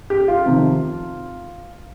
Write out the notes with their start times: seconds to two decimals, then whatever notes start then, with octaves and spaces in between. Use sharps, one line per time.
0.10 G4
0.28 F4
0.45 F2 C3 D#3